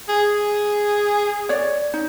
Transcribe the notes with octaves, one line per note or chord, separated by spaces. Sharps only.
G#4
C#5 D5
D#4